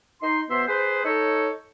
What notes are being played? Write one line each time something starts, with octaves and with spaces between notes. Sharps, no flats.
D#4 C6
B2 B3 C5 E5 C6
G#4 B4 C5
D#4 A4 C#5